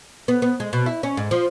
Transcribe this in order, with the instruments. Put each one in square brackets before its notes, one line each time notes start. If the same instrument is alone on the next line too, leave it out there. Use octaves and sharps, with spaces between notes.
[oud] B3
B3
G#3
B2
E4
C#4
G#2
F3